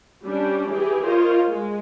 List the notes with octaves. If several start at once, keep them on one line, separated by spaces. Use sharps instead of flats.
G3 C#4 D4
E3 G4 G#4
F4 A#4 C5 C#5 D#5
G#3